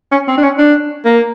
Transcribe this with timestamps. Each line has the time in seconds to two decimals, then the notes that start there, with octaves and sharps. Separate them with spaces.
0.12 C#4
0.28 C4
0.38 D4
0.43 C#4
0.58 D4
1.05 A#3